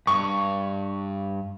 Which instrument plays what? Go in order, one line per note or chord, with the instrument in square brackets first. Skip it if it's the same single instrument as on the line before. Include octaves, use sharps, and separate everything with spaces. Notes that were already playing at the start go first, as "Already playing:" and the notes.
[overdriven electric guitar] G2 [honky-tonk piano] C#6